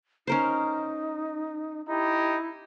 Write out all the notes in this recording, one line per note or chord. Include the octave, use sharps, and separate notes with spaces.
C#4 D#4 A#4 C5
D#4 E4 G4